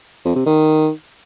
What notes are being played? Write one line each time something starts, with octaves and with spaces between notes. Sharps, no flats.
F2
C3
D#3